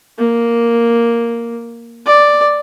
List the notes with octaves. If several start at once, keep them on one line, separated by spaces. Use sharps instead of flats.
A#3
D5